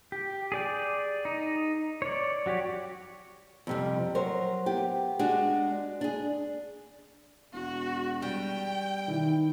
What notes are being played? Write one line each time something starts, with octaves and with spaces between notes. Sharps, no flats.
G4
G#4 D5 G5
D#4
C#5 D5
F#3 F#4 G4 C#5
F2 C3 G3
F#3 A#4 C5
B3 G4
G#3 D4 F#4 G#4
D4 G#4
E1 F#4
G3 G5
D#3 E3